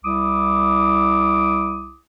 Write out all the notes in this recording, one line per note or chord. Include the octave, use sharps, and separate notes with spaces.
C2 E4 D6 D#6